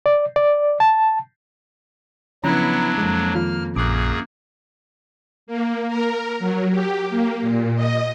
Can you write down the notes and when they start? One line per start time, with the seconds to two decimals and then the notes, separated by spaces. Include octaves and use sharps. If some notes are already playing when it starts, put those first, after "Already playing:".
0.06 D5
0.36 D5
0.80 A5
2.44 C#3 F3 F#3 B3 C#4 D4 E4 A#5
2.98 F2 G#3 A#3
3.35 D#3 F3 F4 F6
3.76 A#1 F#2 A#3 G#4 D6 F#6
5.47 A#3
5.87 A#4
6.39 F#3
6.70 G4
7.10 A#3
7.42 A#2
7.76 D#5